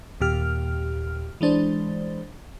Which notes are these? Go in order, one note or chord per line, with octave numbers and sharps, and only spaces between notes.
D#2 A#2 G4 F6
E3 G#3 D4 C5